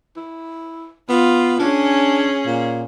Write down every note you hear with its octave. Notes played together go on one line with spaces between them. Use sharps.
E4
B3 F4
C#4 D4 G#4
A#2